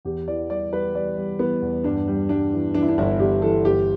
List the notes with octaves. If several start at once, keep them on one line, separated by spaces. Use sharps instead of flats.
E2 G4
E3 D5
G3 D5
G3 B4
G3 D5
G3
E3 B3
E2
G2 D4
G3
G3 D4
E3
E3 D4
E4
D4
G1 E4
G1 G4
E3 A4
G1 G4